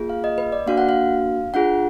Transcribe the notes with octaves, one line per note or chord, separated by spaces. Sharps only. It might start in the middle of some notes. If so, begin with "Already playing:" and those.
Already playing: A#3 F4 G#4
F5
D#5
B4
D5
A#3 D4 F#4 F5
F#5
F5
D4 F4 G#4 F#5